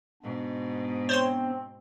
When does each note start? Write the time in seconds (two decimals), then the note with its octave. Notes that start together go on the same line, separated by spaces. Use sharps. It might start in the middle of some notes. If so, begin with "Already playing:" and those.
0.23 G#2 B2 B3 D4
1.09 C4 C5 C#5 C6